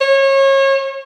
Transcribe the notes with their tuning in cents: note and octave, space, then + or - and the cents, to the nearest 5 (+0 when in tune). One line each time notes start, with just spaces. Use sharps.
C#5 -30